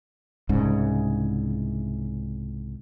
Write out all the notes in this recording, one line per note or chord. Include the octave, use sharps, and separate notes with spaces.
C2 G#2 C#3